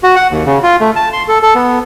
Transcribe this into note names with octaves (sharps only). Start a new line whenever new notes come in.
F#4
F#5
D#2
C#3
F4
A3
A5
C6
A4
A4
B3